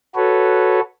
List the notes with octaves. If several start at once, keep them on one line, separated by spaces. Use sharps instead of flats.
F#4 A4 B4 C#5